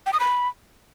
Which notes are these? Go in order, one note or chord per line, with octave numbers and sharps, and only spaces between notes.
G5
D#6
B5